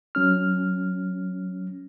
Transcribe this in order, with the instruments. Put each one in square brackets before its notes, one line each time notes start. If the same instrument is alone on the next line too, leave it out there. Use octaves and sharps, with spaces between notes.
[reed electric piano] F#3 C#4 F6